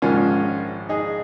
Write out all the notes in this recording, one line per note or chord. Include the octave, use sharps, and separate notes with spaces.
A#1 G#2 D#3 C#4 F4
D#4 G#4